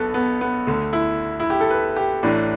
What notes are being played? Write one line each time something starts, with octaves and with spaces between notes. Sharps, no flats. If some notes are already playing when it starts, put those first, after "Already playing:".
Already playing: B1 B3 A4 B4
B3
B3
D2 D3
E4
E4
G4
A4
B4
G4
A1 A2 E3 D4